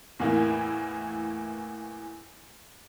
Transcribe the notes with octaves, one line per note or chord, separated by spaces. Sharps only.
E2 A2 E3 A#3 E4